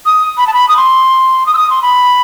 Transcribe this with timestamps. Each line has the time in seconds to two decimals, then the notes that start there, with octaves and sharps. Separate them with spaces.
0.06 D#6
0.37 B5
0.47 A5
0.54 B5
0.69 D#6
0.77 C6
1.46 D#6
1.54 E6
1.58 D#6
1.70 C6
1.82 B5